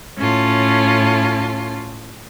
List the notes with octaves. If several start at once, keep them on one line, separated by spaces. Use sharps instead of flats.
A2 C#4 F4 A5